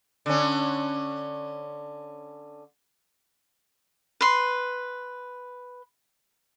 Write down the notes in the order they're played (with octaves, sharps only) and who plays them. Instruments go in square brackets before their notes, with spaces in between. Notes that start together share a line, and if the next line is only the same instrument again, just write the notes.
[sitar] D3 C#4
[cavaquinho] B4 C6